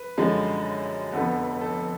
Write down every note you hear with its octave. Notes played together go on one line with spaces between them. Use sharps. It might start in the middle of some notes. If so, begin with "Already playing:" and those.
Already playing: B4
F#2 D3 F3 G#3
F1 F2 D3 F3 B3 A4
A4